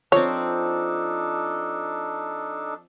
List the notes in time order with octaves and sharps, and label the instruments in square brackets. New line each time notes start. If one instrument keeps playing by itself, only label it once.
[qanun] F3 C4 [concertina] D4 D#4 A4 [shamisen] C#5